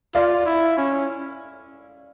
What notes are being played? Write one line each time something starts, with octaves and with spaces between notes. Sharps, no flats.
F4 D5 F5
E4
C#4